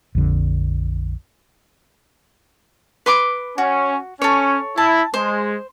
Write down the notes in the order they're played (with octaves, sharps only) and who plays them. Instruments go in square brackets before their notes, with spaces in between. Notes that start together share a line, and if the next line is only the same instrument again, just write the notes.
[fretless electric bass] A#1 F2 D3
[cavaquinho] B4 C6 D6
[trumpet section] C#4 [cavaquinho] F#4
[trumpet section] C#4 [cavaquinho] A4 C#5
[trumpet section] E4 [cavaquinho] A5
[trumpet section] G#3 [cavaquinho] C5